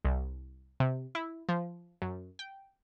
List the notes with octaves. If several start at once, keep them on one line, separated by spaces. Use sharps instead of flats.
C2
C3
E4
F3
F#2
G5